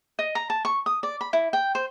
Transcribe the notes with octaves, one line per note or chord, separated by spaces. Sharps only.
D#5
A#5
A5
C#6
D#6
D5
B5
E4
G5
C5